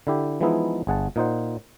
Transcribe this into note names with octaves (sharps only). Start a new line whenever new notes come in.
D3 E4 G4
E3 F3 G#3 B3 D#4 E4
G1 G#4 F#5 A5
A#2 D#4 C5 F#5